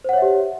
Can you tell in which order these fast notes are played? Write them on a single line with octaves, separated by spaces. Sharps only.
C5 F#5 C#5 E5 G4